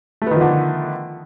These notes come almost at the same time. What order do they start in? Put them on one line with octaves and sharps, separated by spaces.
A3 B3 D#3 F3 D3